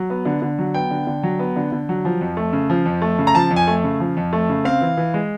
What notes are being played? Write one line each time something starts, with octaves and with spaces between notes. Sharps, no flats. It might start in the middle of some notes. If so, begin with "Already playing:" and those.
Already playing: F#3
B3
D3
D3
F#3
B3 G5
D3
D3
F#3
B3
D3
D3
F#3
F3
F2
A3
C#3
F3
F2
A3
C#3
A#5
F3 A5
F2
G#5
A3
C#3
F3
F2
A3
C#3
C4 F5
E3
E3
G#3